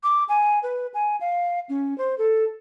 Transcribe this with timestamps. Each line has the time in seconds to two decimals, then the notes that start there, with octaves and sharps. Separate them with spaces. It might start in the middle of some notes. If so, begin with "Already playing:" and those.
0.03 D6
0.29 G#5
0.63 B4
0.94 G#5
1.20 F5
1.69 C#4
1.98 C5
2.18 A4